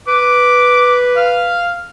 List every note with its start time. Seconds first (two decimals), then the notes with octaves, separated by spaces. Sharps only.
0.08 B4 D6
1.16 F5